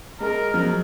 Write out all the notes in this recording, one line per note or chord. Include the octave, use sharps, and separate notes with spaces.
G#3 A#4
F3
F#3